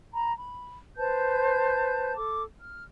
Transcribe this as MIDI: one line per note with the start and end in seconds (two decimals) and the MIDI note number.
0.14 0.33 82
0.14 0.33 83
0.37 0.78 83
0.97 2.15 71
0.97 2.15 72
0.97 2.15 81
0.97 2.15 91
2.16 2.43 69
2.16 2.43 86
2.59 2.84 89